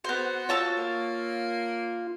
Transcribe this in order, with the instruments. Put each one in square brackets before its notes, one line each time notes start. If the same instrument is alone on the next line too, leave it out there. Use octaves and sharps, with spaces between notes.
[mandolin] B3 C5 [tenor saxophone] F#4
[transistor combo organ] F4 [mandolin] C#5 A5 E6
[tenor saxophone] A#3